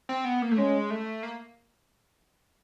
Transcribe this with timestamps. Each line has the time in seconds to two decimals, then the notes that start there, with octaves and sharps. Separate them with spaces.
0.09 C4
0.25 B3
0.42 A#3
0.51 A3
0.57 G#3 C#4
0.90 A3
1.23 A#3